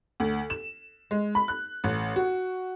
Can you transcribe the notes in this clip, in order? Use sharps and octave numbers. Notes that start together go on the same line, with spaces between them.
D2
E7
G#3
B5
F#6
A1
F#4